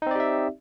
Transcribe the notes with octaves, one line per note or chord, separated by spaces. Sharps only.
C4 D#4 G4 D5 E5